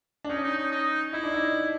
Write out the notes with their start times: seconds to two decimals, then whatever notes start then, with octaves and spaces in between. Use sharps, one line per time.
0.24 D4
0.29 C#4 D#4
0.44 D#4
0.58 D#4
0.72 D#4
1.13 D#4 E4
1.23 D4
1.34 D#4